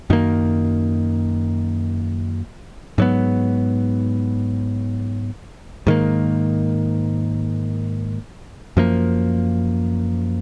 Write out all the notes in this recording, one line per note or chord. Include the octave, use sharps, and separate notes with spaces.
F#2 D#3 A#3
G#2 F#3 B3
G#2 D#3 A#3
F#2 F3 A#3